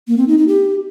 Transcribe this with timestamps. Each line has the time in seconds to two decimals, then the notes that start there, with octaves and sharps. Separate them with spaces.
0.07 A#3
0.17 C4
0.27 D#4
0.37 D#4
0.47 G4